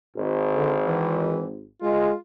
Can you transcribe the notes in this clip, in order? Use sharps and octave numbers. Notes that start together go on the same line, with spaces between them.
G#1
D3
E3
G#3 F4